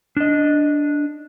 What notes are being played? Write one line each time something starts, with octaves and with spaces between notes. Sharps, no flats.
D4 D#5